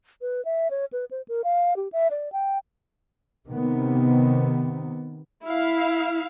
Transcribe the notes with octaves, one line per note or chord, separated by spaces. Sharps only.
B4
E5
C#5
B4
C5
A#4
F5
G4
E5
D5
G5
C3 D#3 B3
E4 F5